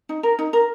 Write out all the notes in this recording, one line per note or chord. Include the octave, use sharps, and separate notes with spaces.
D#4
A#4
D#4
A#4